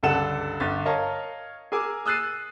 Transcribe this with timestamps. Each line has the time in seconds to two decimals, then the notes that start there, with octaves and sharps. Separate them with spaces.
0.03 C#2 G2 D3 A4 F#5 E7
0.60 G1 A6
0.85 A#4 C#5 D#5 F5 A5
1.72 G#4 A#4 G#5 D6 E6
2.06 D#6 E6 F#6 A6 C7 D#7